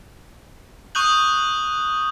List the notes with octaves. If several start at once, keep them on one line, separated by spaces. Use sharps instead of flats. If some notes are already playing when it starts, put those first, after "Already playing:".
C#6 D#6 F#6 G6 F#7